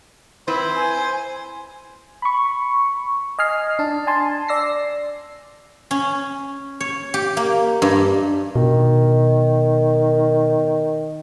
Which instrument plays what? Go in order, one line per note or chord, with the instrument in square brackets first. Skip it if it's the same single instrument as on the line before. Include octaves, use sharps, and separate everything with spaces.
[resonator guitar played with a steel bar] C4 E4 B4 [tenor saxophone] C5
[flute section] G#5
[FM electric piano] B5 C#6
D#5 G#5 F6 C7
D4 A5
G#5 A5 C6
D5 E6 A#6 C7
[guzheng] C#4
C#5
G4
A#3
G2
[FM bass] B2 [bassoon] D#3